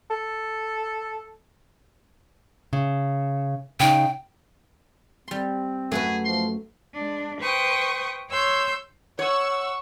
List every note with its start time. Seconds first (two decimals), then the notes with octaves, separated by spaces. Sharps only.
0.11 A4
2.73 C#3
3.80 C#3 D#4 G5
5.28 G3 C4 C6
5.92 F#2 A3 F#4 G#4 B4
6.25 F3 C6
6.94 G#3 D4
7.40 B4 C5 G5 C#6 D#6
8.30 C#5 C6 E6 G6
9.19 C#5 F#5 C#6 E6